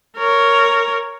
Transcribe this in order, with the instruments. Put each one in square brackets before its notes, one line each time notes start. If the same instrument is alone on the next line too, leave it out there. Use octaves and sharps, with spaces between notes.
[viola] A#4 C#5